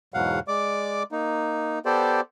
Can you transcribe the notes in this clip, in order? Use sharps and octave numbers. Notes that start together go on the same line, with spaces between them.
E2 G#2 B2 F#3 F5 F#5
G#3 D5 D6
A#3 D#4
B3 G4 A4 C5 D5